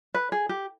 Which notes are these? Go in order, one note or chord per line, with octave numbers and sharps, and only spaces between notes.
B4
G#4
G4